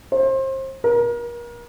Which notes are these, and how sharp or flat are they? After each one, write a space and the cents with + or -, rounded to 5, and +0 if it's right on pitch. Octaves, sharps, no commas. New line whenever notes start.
C5 +30
A#4 +35